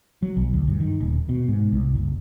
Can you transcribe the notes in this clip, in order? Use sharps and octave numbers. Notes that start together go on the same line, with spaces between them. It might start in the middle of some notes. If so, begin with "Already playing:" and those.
F#3
B1
D2
G2
D#3
D#1
B2
G#2
C2
F#1